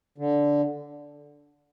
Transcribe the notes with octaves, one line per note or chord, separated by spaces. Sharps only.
D3